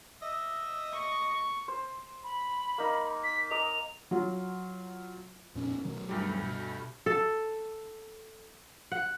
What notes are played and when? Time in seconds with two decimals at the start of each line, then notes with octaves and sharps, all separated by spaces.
0.22 D#5 E5
0.92 C#6
1.68 C5
2.24 B5
2.78 A#3 D#4
3.24 B6
3.51 D#5 A#5 D6 F7
4.11 F#3 F4
5.55 F2 A#2 C#4
5.85 B2 D#3 F#3
6.09 D2 G2 G3
6.43 B2
7.06 A4
8.92 F#5